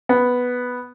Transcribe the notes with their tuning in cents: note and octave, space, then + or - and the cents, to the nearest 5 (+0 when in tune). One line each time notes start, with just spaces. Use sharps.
B3 +0